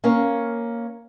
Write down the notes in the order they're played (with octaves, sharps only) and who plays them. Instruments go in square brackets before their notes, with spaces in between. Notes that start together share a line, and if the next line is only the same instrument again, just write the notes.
[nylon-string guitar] A#3 C#4 A#4 F5